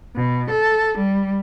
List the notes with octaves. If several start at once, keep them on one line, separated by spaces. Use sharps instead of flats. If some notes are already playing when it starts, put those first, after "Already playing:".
B2
A4
G3